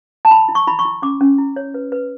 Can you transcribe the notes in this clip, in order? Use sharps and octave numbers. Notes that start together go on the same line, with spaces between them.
A5
E4 B5
E4
C#6
E4 B5
C#6
E4
C#4 D6
C#4
E4
C#5
B4
B4